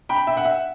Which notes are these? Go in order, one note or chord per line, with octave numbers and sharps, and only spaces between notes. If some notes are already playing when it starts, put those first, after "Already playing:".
G5 B5
E5 G5
F#5
E5